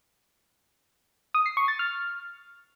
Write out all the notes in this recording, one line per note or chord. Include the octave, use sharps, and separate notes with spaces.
D#6
C7
C#6
A6
F6